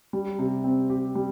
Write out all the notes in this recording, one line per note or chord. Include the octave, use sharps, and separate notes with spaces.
G3
C3
C4
G4
G3